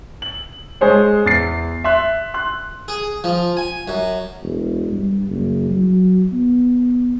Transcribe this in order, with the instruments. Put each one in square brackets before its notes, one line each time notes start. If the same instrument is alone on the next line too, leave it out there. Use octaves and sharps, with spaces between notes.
[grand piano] F#7
G#3 G#4 C5 C#5
E2 A6 C7
E5 C6 F#6
C6 F#6
[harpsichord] G#4
F3
G#5
F#2
[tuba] E1
G2
F#1
F#3
B3